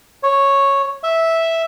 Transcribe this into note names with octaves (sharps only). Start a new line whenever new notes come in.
C#5
E5